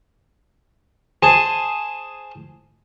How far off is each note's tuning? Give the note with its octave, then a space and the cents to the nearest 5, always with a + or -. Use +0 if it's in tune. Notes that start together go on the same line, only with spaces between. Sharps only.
G#4 +0 C5 +0 A5 +5